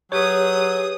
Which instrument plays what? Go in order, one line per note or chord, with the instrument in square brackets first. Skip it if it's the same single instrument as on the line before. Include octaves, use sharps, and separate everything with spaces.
[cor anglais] F#3 [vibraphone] G4 B4 [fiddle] G#4 D#6 [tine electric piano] C#5